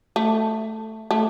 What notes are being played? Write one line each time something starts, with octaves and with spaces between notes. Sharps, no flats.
A3
A3